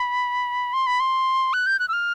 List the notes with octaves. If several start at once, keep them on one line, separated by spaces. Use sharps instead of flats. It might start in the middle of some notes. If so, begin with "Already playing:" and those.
Already playing: B5
C6
B5
C6
F#6
G6
F#6
E6
F6